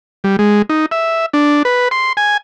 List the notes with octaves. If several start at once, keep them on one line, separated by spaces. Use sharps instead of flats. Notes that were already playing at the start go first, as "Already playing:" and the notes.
G3
G#3
D#4
E5
D4
B4
C6
G#5